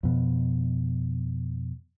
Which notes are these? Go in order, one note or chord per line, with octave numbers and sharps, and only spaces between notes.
F2 B2